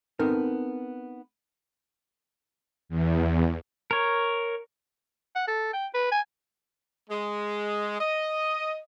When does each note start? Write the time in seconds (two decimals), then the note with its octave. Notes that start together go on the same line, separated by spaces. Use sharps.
0.19 B3 C4 D#4 A4 A#4
2.89 E2
3.91 A#4 C#5
5.35 F#5
5.47 A4
5.73 G5
5.94 B4
6.12 G#5
7.10 G#3
8.00 D#5